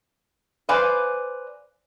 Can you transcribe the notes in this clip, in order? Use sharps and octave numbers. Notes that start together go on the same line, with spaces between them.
B4 C5 D5 F5 G#5